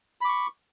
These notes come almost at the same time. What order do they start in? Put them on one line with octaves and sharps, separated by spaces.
B5 D6 C#6